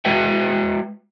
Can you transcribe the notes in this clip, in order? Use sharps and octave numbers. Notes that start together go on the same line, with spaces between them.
G#3 F#4 B4 E5 G5